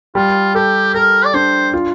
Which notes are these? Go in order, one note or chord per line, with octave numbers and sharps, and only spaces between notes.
G3 F4
G4 A4
A4 A#4
D5
D4 C5
F4